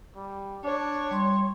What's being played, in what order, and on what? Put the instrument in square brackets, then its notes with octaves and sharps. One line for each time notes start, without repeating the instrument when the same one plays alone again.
[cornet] G3
[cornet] D4 [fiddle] C#5
[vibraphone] G3 C6